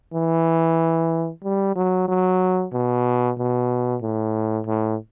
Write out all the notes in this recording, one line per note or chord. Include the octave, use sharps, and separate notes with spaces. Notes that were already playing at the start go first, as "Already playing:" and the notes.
E3
G3
F#3
F#3
B2
B2
A2
A2